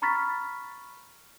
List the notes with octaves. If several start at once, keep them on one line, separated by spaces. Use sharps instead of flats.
A#5 B5 C#6 F6 A6 B6